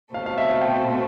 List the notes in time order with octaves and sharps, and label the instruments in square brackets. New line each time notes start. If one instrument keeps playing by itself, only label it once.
[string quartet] B2 A3 C4 [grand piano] F5
[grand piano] F5
E5
F5
G5